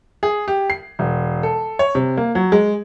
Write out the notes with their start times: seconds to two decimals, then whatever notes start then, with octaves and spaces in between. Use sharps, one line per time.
0.23 G#4
0.48 G4
0.70 C7
0.99 E1
1.43 A4
1.79 C#5
1.95 C3
2.17 A#3
2.35 F#3
2.52 G#3